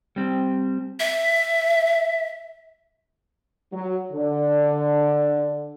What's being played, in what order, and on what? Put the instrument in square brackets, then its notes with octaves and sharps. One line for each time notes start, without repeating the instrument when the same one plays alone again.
[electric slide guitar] G3 C4
[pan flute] E5
[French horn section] F#3
D3